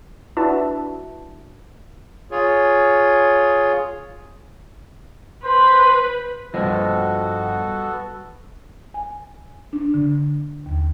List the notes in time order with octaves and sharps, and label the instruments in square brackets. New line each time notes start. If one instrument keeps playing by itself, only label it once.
[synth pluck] D4 E4 F#4 B4 E5 A5
[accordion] F4 G#4 C#5
[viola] B4 [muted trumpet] C5
[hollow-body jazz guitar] G2 B2 F3 [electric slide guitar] G3 D#5 [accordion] B3 F#4 A4
[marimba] G#5
D4
D3
D#2